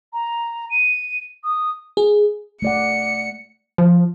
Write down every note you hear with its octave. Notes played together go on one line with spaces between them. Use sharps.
A#5
D#7
D#6
G#4
A3 D5 F#5 C#7
F3